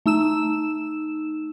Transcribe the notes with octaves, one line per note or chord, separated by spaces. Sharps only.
A3 D#4 E6 E7